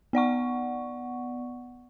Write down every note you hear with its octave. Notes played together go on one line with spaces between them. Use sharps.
B3 D5 F#5 C#6